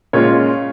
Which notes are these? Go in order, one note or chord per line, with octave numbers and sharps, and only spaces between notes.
A#2 G#3 C#4 F4 C#5